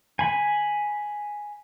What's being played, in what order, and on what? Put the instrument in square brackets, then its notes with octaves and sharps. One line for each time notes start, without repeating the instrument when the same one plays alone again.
[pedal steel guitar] G#5 B5